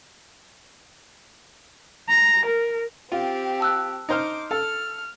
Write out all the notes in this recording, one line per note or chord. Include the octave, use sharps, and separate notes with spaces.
A#5
A#4
C4 F4 G4
A5 E6 F#6
D#4 C5 D6 F6
A4 F5 F6